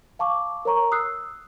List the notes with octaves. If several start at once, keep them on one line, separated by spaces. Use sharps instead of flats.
F5 A5 C#6 D6
A#4 C#5 A#5 C#6
D#6 E6 F#6 C7